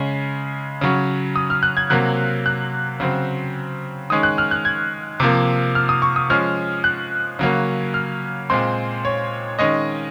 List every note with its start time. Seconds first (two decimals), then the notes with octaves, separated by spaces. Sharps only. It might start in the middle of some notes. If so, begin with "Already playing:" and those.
Already playing: C#3 G#3 C#4
0.81 C#3 F#3 C#4
1.36 D#6
1.50 F6
1.63 F#6
1.77 G#6
1.90 C3 F#3 A#3 F#6
2.46 F#6
3.00 C#3 F#3 C4
4.10 D#3 G#3 C#4 D#6
4.23 F#6
4.38 F6
4.51 F#6
4.65 G#6
5.20 C3 F3 A#3
5.75 F6
5.89 D#6
6.02 C#6
6.16 D#6
6.30 F3 G#3 C#4 F6
6.84 F#6
7.39 C#3 F#3 A#3 C#4
7.94 F6
8.50 A#2 G#3 C4 C6
9.05 C#5
9.59 D#3 G#3 C#4 D#5